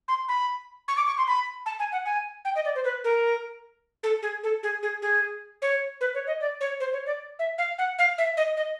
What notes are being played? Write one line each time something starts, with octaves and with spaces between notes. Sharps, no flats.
C6
B5
C#6
D6
C#6
C6
B5
A5
G#5
F#5
G#5
G5
D#5
D5
C5
B4
A#4
A4
G#4
A4
G#4
G#4
G#4
C#5
B4
C#5
D#5
D5
C#5
C5
C#5
D5
E5
F5
F#5
F5
E5
D#5
D#5